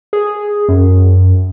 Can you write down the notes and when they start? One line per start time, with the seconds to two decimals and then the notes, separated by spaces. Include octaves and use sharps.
0.13 G#4
0.69 F#2